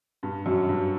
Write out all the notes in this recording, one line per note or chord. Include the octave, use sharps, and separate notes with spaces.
G2
F#2
G2